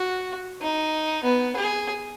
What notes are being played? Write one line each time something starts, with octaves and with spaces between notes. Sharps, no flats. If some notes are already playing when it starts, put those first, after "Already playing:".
Already playing: F#4
D#4
B3
G#4